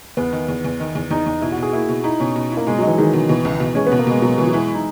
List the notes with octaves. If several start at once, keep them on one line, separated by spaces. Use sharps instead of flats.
E2 B3
D#3
E2
E2
D#3
E2
E2 D#4
E2
B2 E4
F#4
B2 G#4
A#3 E4
B2
D#4 E4
B2 C#4
B2
E4
A#3
B2 G#3
F#3 D#4
E3
D#3 G#3
B2
B2 E3
C#2
B2
G#3 C#4
B3
B2
A#3
B2 G#3
B2 F#3
B2 E3
F#3
G#3 E4
D#4